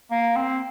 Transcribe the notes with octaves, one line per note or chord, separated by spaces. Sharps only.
A#3
C4